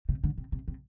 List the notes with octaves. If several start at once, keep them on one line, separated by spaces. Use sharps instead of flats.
C3
D3
C3
C3
C3